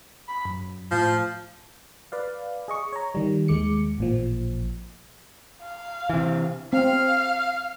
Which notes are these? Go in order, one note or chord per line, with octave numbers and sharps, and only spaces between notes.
B5
F#2
A2 F3
B4 D5 F5
G#4 D#5 C#6
C#5 A#5
D#3 G3
D#2 G#3 D6 C#7
A1 A#2 F3
F5
C3 E3
C4 F5